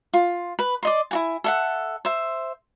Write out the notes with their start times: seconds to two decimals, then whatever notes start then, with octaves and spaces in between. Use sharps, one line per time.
0.13 F4
0.59 B4
0.83 D5 D#5 C6
1.11 E4 F#4 G#5
1.44 A4 E5 F#5
2.05 C5 E5